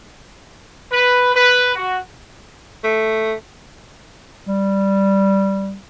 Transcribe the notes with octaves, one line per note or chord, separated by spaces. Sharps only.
B4
B4
F#4
A3
G3